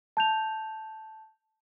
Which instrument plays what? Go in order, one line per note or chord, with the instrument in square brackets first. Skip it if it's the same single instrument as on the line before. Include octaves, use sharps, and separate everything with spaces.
[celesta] A5 G6 F7